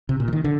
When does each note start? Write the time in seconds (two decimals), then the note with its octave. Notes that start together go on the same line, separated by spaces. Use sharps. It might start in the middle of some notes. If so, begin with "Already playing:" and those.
0.09 C3
0.20 A#2
0.28 E3
0.33 D#3
0.44 D3